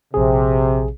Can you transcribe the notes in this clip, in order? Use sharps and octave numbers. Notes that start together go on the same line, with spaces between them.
A#1 C3 G#4